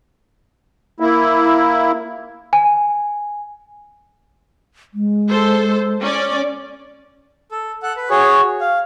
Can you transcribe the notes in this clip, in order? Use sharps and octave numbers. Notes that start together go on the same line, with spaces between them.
A#3 E4
G#5
G#3
A4 C5
C#4 D5
A4
A4 F#5
B4
F#4 G#4 C#5
F5